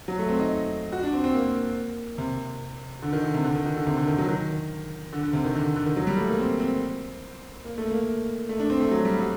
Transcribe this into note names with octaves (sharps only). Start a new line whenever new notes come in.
F#3
A3
C4
D#4
F#4
D4
C4
C4
A#3
C3
D3
D#3
D3
C3
D3
D#3
D#3
D3
C3
D3
D#3
F#3
D#3
D3
D3
C3
D#3
D3
D3
D#3
F#3
G3
A3
A#3
C4
C4
A#3
A3
A#3
A3
D4
C4
A3
F#3
G3
F#3